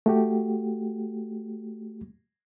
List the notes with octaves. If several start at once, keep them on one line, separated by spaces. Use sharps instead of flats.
A3 F#4 G4